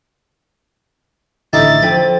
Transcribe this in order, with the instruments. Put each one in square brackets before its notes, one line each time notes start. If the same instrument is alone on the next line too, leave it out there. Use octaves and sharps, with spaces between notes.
[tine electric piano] A1 D3 [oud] A2 [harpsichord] D#4 E4 G4 [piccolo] A6
[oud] E2 D3 C4 [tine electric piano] F3 G5 [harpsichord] B5